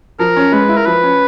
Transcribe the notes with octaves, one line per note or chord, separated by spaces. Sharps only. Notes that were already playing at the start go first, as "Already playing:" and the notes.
F3 A#4
C#4
G#3 B4
E4
A#4
F3 B4
C#4